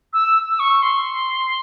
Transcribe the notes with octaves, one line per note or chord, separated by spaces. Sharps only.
E6
E6
C#6
C6